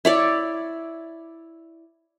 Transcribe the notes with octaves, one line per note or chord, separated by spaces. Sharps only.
E4 C#5 D5